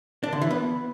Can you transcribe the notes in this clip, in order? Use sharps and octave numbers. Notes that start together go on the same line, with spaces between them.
D4
D3
E3
B3